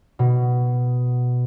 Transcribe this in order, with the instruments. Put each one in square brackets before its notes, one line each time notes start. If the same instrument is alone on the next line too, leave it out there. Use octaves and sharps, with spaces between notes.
[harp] B2